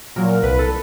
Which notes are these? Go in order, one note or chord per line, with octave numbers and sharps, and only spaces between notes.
A#2 F#3 A#4
C2 B4
A4